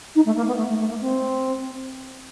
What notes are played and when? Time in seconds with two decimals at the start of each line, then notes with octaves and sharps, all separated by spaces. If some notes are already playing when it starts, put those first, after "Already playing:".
0.15 D#4
0.25 A3
0.36 A#3
0.47 B3
0.57 A3
0.68 A3
0.79 A3
0.89 A#3
1.00 C4